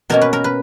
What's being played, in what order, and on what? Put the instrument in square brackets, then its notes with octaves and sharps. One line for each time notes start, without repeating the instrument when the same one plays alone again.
[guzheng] B2 A#3 C#4 A#4
B4
A#4
B4